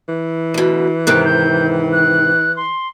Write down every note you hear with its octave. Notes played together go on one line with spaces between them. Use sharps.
E3
D2 B2
G#2 C3 D#3 F#6
G6
F#6
C6